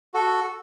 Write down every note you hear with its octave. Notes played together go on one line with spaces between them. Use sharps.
F#4 A4